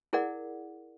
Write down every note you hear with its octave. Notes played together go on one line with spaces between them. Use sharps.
E4 G#4 A#4 D5 F#5